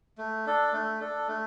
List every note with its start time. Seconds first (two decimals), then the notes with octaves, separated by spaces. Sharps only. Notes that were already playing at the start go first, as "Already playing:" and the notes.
0.18 A3
0.46 D4 A4
0.72 A3
1.00 D4 A4
1.28 A3